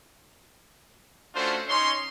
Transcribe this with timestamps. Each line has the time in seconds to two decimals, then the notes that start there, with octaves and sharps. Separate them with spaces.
1.35 A3 C#4 D4 F4 F#4 C5
1.68 C#4 D#4 C#5 C6